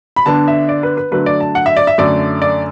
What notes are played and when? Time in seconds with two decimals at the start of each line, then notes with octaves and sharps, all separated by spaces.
0.16 B5
0.26 D3 B3 D4 A5
0.48 E5
0.69 D5
0.83 B4
0.97 B4
1.11 D3 F#3 A3 D4 B4
1.26 D5
1.41 A5
1.55 F#5
1.66 E5
1.77 D5
1.87 E5
1.98 F#2 D3 A3 D5
2.42 D5